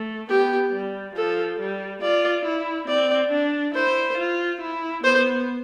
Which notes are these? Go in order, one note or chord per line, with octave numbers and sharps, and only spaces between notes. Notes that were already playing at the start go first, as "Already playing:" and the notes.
Already playing: A3
B3 G4
G3
F3 A4
G3
F4 D5
E4
C4 D5
D4
E4 C5
F4
E4
B3 C5